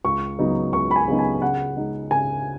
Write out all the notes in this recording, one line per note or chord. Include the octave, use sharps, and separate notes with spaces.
C#2 C#6
C#3 F#3 B3 D#4
C#2 C#6
B5
G#5
C#3 F#3 B3 D#4
G#5
C#3 F#5
G#3 D#4
C#3 G#5